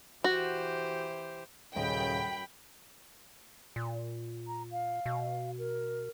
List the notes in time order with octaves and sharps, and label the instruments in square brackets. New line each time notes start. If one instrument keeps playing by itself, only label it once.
[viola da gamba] E3 G4 C5 [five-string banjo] F#4
[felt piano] D#1 D#5 [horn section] F#2 B5 [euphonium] C#3 [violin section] G5
[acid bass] A#2
[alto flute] A#5
F5
[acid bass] B2
[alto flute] A#4